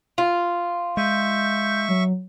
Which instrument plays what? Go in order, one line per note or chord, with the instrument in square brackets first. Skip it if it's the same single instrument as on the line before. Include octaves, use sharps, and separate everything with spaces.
[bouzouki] F4
[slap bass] G#3 [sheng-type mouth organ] E5 C#6 [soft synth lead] G6
[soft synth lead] F#3